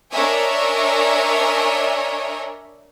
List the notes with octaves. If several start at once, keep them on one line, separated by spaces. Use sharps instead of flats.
D4 A#4 C#5 D#5 E5 G#5